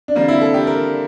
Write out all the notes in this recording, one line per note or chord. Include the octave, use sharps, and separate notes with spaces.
D4
D3 G3 A#3 C4
E4
A4
G4
A#4